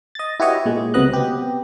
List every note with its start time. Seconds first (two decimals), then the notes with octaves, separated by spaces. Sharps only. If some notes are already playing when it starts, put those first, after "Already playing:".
0.15 D#5 A6
0.40 E4 F#4 G4 B4 C#5 D#5
0.66 A#2 G#3
0.94 C#2 C3 F#3 B3 D#5 F#6
1.13 B3 G4